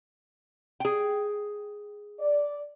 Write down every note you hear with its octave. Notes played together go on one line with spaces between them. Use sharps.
G#4 G5
D5